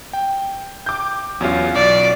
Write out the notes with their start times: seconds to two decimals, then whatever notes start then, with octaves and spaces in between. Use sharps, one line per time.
0.13 G5
0.86 D6 G6
1.41 E2 F#3 C#4 F4
1.75 B1 D5